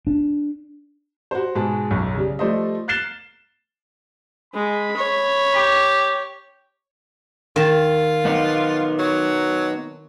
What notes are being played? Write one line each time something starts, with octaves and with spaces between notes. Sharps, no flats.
D4
F#4 G4 C5
G#2 B2 G#3 G#4 A5
B1 F#2 C#6
C#3 G3
F3 G3 A3 C5 D5 D#5
F6 F#6 A6 C7 E7 G7
G#3 B5
C#5
G4
D#3 F4 A5
B3 D#4
F#3